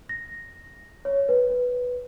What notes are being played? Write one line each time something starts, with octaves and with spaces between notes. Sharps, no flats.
A#6
C#5
B4